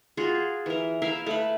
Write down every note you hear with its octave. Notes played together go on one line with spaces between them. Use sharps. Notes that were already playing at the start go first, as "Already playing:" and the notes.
F4 F#4 G#4
E3 A#4
E4 A#4 E5 F5
A3 B4